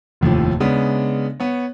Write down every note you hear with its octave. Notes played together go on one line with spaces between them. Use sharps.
F1 D#2 A2 F3
C#3 G#3 B3 D4
B3 C#5